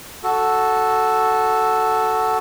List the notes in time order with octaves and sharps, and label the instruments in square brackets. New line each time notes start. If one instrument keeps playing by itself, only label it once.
[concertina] F#4 A4